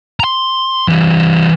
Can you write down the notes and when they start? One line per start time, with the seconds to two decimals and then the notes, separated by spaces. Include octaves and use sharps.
0.20 A#5 C6
0.88 E3 G3